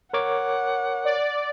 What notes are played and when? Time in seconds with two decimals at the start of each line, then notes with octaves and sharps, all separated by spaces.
0.13 A#4 C#5 F#5 D6
1.05 D5